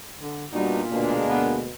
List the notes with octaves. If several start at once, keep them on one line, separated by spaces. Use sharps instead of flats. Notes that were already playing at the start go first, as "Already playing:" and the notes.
D3
A#2 G3 B3 D4 D#4 F#4
D2 B2 G#3 A#3 D4
B3